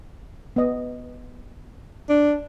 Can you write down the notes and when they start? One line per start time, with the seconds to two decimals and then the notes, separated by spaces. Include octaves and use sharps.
0.56 B3 D#5
2.09 D4